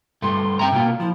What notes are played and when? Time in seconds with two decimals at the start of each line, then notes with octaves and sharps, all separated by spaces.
0.22 G2 A3 C6
0.59 C4 E5 G5 A#5
0.72 B2 A#3 F4
1.00 F3 E4